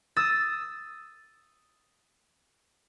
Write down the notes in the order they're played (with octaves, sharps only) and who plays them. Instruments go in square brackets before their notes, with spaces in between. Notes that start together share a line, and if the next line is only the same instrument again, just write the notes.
[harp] D#6 E6 A6